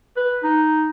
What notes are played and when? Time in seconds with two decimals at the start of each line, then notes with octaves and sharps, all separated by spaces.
0.17 B4
0.43 D#4